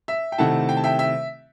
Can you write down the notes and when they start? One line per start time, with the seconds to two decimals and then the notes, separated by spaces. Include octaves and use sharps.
0.08 E5
0.32 G5
0.38 C3 D#3 A3 E4 F#5 A5
0.69 G5
0.77 A5
0.84 E5 G5
0.99 E5